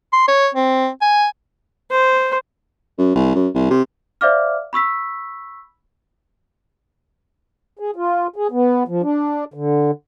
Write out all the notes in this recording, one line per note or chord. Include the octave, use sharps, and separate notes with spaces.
C6
C#5
C4
G#5
C5
F#2
C2
F#2
C2
C3
C5 D5 E5 F5 D6 F6
B5 C#6 E6 B6
G#4
F4
G#4
B3
F3
D4
D3